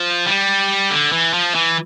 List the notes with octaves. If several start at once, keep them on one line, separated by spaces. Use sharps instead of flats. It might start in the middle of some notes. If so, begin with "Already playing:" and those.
Already playing: F3
G3
D3
E3
F3
E3